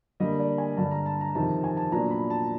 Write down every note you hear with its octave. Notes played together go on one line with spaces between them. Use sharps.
D3 G3 A#3 D4 D#5
D5
G#5
G2 D3 G3 A5
A#5
A5
A#5
F2 C3 D#3 A5
G#5
A5
A#2 F#3 B3 D4 A#5
B5
A5